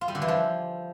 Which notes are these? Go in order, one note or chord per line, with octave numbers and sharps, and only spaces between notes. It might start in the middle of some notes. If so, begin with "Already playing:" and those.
F4
G3
D3
E3
F3